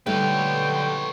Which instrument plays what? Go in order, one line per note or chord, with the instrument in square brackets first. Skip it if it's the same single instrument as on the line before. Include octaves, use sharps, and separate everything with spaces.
[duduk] D3 [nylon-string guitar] G3 A3 D#4 [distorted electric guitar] B4 C#5 [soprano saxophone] G5